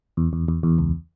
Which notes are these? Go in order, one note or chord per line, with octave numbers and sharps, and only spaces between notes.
E2
E2
E2
E2
C#2